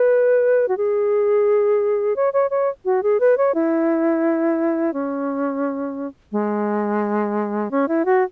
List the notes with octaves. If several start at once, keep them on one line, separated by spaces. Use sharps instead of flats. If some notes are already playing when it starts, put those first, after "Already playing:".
Already playing: B4
F#4
G#4
C#5
C#5
C#5
F#4
G#4
B4
C#5
E4
C#4
G#3
C#4
E4
F#4